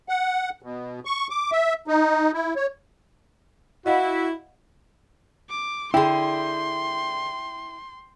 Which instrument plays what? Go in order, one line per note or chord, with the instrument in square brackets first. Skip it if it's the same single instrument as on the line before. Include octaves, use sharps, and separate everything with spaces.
[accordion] F#5
B2
C#6
D6
E5
D#4
E4
C#5
[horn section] E4 [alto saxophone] F#4 [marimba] D#5 F5 F#5
[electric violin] D6
[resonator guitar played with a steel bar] D3 G#4 [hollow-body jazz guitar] E4 [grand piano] G5 [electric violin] C6